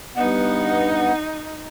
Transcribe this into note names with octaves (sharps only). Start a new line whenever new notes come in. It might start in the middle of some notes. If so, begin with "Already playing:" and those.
G2 B3 D#4 F#5